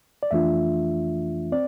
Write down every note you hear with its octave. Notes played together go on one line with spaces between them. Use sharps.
D5
F2 E3 A3 D4 F4 E5
C4 D5